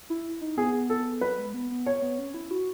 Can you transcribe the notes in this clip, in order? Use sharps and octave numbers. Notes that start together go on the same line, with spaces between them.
E4
D#4
B3 G#4
A4
F#3 B4
G#3
B3
B3
C#5
B3
C#4
E4
F#4